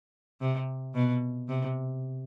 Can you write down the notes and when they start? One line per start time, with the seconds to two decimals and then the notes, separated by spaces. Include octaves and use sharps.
0.41 C3
0.95 B2
1.49 C3